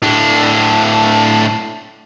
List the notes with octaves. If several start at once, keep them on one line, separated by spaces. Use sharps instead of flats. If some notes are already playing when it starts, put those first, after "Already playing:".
A2 D4